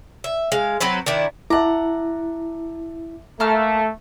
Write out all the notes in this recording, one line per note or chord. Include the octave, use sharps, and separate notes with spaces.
E5
G#3 F5
F#3 C4 B4 C5
D#3 D4 E4
E4 E5 F#5 A5 A#5 D6
A3 A#3 A5 F6